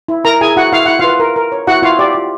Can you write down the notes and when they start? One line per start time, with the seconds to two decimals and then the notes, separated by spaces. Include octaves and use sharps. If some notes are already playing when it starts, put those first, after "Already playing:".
0.08 E4
0.24 E4 A#4 A#5
0.41 E4 G#4 G#5
0.56 E4 F#4 F#5
0.72 E4 F5
0.86 E4 F#5
0.99 F4 B4 F5
1.20 A#4
1.36 A#4
1.52 C#5
1.67 E4 F#4 F#5
1.82 E4 F4 F5
1.99 G4 D5
2.15 F4